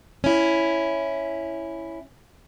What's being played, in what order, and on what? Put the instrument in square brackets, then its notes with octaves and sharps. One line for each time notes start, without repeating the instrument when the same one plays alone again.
[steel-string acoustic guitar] C#4 E4